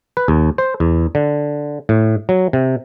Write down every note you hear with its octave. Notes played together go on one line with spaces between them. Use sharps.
B4
D#2
C5
E2
D3
A2
F#3
C3